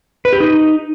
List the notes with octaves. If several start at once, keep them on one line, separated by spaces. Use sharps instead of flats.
B4
G4
D#4